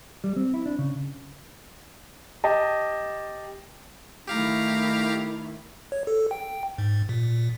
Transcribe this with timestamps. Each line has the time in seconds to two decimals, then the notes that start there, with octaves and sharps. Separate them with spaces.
0.24 G3
0.36 C4
0.54 E4
0.66 D4
0.79 C#3
2.44 G4 D#5 A5
4.27 D#3 A3 E4 G4 F5 A#5
5.92 C#5
6.07 A4
6.31 G5
6.78 G#2
7.09 A#2